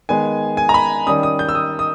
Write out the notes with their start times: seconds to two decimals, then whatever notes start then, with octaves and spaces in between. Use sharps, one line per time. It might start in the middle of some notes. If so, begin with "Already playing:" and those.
0.09 D#3 G#3 B3 G#5
0.57 G#5
0.69 A#5
0.74 B5
1.06 D#3 G3 C#4 D#6
1.23 D#6
1.39 G6
1.49 E6
1.55 D#6
1.79 D#6